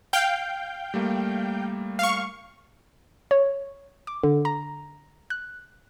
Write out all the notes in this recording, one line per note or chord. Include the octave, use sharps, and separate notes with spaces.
F5 G5 G6
G3 A3 A#3
F5 C#6
C#5
D6
D3
A#5
F#6